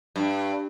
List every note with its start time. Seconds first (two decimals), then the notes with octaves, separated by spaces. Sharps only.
0.16 G2